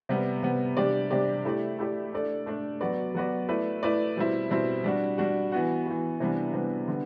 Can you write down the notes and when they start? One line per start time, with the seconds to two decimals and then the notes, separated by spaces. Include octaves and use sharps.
0.09 C3 G3 B3
0.43 C3 G3 B3
0.77 C3 G3 D4 G4 D5
1.10 C3 G3 D4 G4 D5
1.45 A3 E4 G4 D5
1.79 A3 E4 G4 D5
2.13 A3 D4 A4 D5
2.46 A3 D4 A4 D5
2.81 F#3 B3 F#4 B4 D5
3.15 F#3 B3 F#4 B4 D5
3.48 A3 E4 B4 D5
3.83 A3 E4 B4 D5
4.16 B2 G3 C4 E4
4.50 B2 G3 C4 E4
4.84 G3 D4 F#4
5.18 G3 D4 F#4
5.52 E3 B3 F#4
5.86 E3 B3 F#4
6.20 C3 E3 G3 B3 D4
6.53 C3 E3 G3 B3 D4
6.88 D3 G3 B3